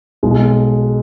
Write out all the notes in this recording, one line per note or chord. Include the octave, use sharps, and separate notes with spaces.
B1 B2 G#3